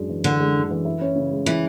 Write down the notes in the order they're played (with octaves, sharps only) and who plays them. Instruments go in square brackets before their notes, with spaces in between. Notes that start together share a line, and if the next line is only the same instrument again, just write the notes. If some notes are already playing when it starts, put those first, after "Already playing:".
Already playing: [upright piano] F#2 G#3 D4
E3
[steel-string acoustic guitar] D3 [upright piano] D4
[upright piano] G#3
F#2
E3
E4
C#4
C#3
G#3
[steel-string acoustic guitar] E3 [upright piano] E4